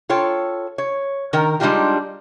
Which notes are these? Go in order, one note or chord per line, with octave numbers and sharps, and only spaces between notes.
F4 A4 C#5 G5
C#5
D#3 A#4 G5
G3 G#3 D4 D#4 F4 G4